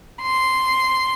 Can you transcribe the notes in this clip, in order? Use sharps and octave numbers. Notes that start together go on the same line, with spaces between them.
C6